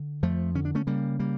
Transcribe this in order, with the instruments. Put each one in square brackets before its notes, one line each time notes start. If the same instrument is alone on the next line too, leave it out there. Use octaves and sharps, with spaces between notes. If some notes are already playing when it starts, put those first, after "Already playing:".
Already playing: [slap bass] D3
F2 F3 A3
D3 C#4
D4
A3 C#4
C#3 G3 A#3
G3 A#3